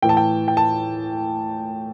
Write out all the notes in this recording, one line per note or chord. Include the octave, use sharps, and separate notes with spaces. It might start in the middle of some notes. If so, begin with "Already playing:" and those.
A2 E3 G5
A5
G5
G5
A5